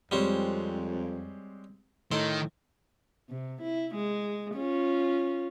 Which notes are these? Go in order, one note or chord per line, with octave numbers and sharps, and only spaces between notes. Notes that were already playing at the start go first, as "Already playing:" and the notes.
F2 G3 G#3 C4 C#4 G4 C5
A2 D#3 D#4 C5
C3
E4
G#3
C#4 F4